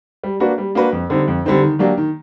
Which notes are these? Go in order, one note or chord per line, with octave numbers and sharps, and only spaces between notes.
G3
A#3 D4 F#4 B4
G3
A#3 D4 F#4 B4
F2
D3 G3 C4 D#4
F2
D3 G3 C4 D#4
D#3
F#3 A#3 D4 G4
D#3